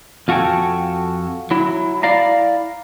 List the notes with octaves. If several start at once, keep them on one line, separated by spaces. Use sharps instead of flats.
F2 F4 F#4 A4 G5 G#5
F#3 E4
E4 D5 F5 A#5